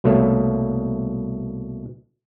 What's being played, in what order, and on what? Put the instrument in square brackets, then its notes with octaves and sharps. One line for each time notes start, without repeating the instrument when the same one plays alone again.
[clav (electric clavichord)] C2 B2 A3 A#3 C#5